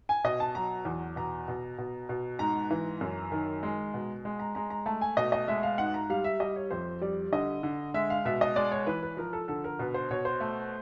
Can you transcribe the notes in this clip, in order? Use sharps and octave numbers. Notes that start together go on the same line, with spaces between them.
G#5
B2 D#5
A5
F#3 A#5
E2
B2 A#5
B2
B2
B2
G#2 A#5
E3
F#2
D#3
G#3
B2
G#3
A#5
G#3 A#5
A#5
A3 A5
G#5
B2 D#5
D#5
G#3 E5
F5
G#2 F#5
A#5
G3 F5
E5
G3 D#5
C#5
F2 C5
G3 D5
D3 D#5
D3
G#3 E5
F5
B2 E5
D#5
G#3 D5
C#5
E3 B4
B4
F3 A#4
A4
D3 A4
A#4
B2 B4
C5
B2 C#5
C5
A3